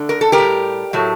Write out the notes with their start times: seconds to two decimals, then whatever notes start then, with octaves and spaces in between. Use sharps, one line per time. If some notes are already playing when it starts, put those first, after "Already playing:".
Already playing: D3 A3
0.09 A#4
0.21 A4
0.32 G4 A#4
0.38 A2 G3
0.93 A2 F#3 A3